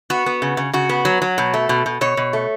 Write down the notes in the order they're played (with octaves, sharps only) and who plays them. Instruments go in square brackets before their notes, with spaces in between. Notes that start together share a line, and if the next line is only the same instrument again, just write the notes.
[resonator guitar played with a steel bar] B3 F#4
B3
C#3
C#3
C#3 F#4
B3
F#3
F#3
B2
A3
B2
B2
B2 C#5
B2
A3